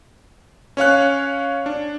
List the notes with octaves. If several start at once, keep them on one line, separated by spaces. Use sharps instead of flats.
C#4 C#5 F5 F#6
D4